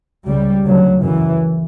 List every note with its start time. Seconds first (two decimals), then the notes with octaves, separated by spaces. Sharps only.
0.25 C#2 C#3 G3
0.64 D2 C#3 F#3
1.03 F#2 C#3 E3